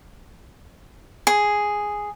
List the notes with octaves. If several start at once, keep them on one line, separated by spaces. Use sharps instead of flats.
G#4